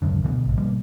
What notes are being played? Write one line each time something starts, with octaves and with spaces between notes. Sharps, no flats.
D1 C#2 F#2 D3
B2 D3 E3 B3
A#1 G#2
B2 F3 G3 A#3